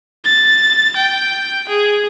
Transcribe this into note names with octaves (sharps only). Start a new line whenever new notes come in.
A6
G5
G#4